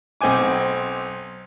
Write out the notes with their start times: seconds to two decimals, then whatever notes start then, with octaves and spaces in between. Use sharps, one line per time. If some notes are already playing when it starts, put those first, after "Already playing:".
0.21 B1 C4 G5 G#5 D6